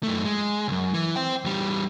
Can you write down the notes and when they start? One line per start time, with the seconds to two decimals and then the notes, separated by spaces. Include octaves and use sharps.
0.03 F#2 A3
0.25 G#3
0.68 C#2 F#2
0.94 E3
1.16 C5 G5
1.45 E2 G3